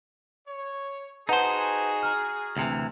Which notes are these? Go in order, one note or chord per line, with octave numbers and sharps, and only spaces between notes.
C#5
D#4 F#4 G#4 B4 C5 F#5 A5
A#5 F6
D2 C3 E3